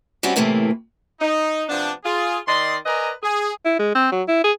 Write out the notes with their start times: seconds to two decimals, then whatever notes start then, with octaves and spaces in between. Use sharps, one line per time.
0.23 G3 C4 C#4 E4 F#4 G4
0.36 A2 C3 E3 A3 A#3
1.20 D#4
1.68 C3 F3 B3 D4
2.04 F4 G#4
2.48 D#3 D5 D#5 C6
2.86 A#4 B4 D5 D#5 G#5 A#5
3.22 G#4
3.66 E4
3.79 G#3
3.95 C4
4.12 F#3
4.28 E4
4.44 G#4